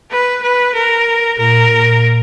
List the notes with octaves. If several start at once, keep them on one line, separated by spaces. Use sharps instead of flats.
B4
B4
A#4
A#2 A#4
A#2